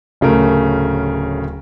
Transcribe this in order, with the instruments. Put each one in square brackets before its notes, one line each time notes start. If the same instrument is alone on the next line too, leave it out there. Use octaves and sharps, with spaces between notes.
[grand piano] D1 C#3 A3 A#4